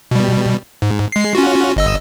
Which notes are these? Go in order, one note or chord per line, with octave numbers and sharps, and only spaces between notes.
B2 G3
G#2
G#3 C7
C#4 F4 F#4
G1 D#5 E6